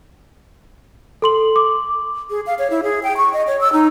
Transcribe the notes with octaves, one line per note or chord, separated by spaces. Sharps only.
A4 C6 F#7
D6
G#4
F5
C#5
E4
G#4
G5
C#6
D#5
C#5
E6
D#4